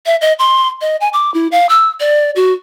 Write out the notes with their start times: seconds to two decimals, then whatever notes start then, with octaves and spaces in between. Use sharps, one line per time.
0.06 E5
0.21 D#5
0.39 C6
0.81 D#5
1.01 G#5
1.13 D6
1.34 E4
1.52 F5
1.69 E6
2.00 D5
2.36 F#4